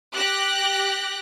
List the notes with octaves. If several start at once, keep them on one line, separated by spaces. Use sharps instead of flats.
G4 F#6 A#6